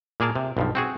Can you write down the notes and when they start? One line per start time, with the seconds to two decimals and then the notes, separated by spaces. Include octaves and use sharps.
0.20 A#2 A#3 G#4 A#4 A5
0.36 C3
0.57 B1 G2 F3
0.75 C4 F#4 G#4